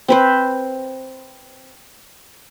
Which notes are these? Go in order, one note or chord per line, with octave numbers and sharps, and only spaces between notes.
C4 B4 C5